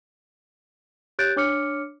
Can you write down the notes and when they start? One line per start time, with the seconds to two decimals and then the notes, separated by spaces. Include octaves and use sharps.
1.19 G4 C#5 F#6 G6 A6 D7
1.36 D4 C#5 D6 F6 C#7